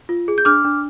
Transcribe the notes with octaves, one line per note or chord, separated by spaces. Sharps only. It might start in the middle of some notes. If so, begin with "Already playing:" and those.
F4
G#4
G6
D4 D6 F6
D4